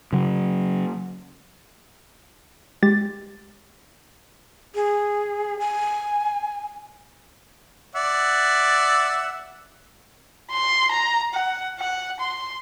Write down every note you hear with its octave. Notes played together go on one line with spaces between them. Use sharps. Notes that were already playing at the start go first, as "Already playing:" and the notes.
C#3 F#3
G#3 G4 A6
G#4
G#5
D5 E5 F#5
C6
A#5
F#5
F#5
C6